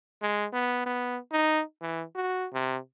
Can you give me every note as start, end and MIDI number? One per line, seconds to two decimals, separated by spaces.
0.22 0.46 56
0.53 0.83 59
0.86 1.18 59
1.32 1.62 63
1.81 2.04 52
2.15 2.47 66
2.53 2.78 48